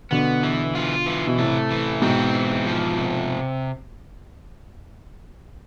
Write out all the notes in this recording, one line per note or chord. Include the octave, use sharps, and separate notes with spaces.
B2 D3 B3
E3
F4
E3
B2
A2 C3 A3
E3
G#2 B2 C4
E3
F3
C3